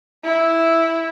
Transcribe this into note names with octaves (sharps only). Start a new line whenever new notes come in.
E4